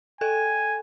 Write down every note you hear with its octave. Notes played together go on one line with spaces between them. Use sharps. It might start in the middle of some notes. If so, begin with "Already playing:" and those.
A4 G5 G#5 G#6